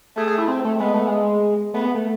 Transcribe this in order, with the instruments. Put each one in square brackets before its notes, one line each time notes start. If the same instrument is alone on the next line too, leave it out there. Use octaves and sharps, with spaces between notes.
[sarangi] A3 [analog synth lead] G#4
[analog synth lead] G#4
E4
C4
A3
[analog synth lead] G#3 [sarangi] B3
[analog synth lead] A3
G#3
[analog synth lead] A3 [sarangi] B3
[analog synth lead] B3
A3